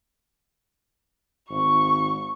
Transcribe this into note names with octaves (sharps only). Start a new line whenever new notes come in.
G#1 C#6